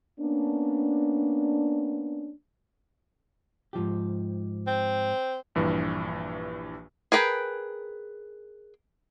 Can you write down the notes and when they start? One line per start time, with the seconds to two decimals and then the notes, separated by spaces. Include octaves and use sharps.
0.20 A#3 B3 C#4 D4
3.73 G#2 F3 G4
4.67 C4
5.55 A#1 G2 E3
7.12 G#4 A#4 B4 G5